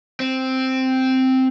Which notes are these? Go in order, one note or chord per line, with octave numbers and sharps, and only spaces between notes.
C4